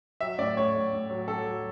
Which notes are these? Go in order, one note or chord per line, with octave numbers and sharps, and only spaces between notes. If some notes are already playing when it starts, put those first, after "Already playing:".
F#3 E5
A2 D5
A2 C#5
A2
A2
F#3
F#3 A4
F#3